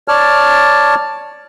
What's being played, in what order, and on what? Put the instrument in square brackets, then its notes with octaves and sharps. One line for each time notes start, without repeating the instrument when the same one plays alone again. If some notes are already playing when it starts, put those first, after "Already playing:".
[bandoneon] C#5 D5 A5 F6